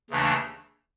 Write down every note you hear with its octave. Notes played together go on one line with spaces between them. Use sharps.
D#2 C#3 E3 A3 D4